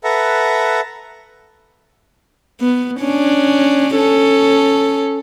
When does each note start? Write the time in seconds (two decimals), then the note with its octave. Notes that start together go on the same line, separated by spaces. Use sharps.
0.04 A4 B4 E5 F#5 A#5
2.61 B3
3.00 C#4 D4
3.95 C#4 A4